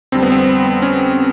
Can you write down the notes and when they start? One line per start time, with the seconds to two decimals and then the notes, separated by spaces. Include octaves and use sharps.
0.12 F2 D3 G3 C4
0.23 B3
0.32 C4
0.82 C#4